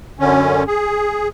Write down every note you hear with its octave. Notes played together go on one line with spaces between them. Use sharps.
F#2 D3 C#4
G#4